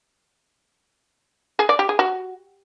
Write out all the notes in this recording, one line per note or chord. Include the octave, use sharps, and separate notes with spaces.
G#4
D5
G4
G#4
F#4